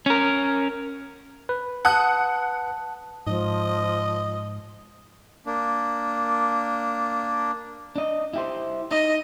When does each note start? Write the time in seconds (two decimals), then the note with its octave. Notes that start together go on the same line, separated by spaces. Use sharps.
0.06 C#4 A#4
1.49 B4
1.85 F#5 A5 D#6 F#6
3.27 G#2 F3 D#5
5.46 A#3 D4
7.96 D4 D#5
8.33 E4 G4 C5
8.91 D#4 D#5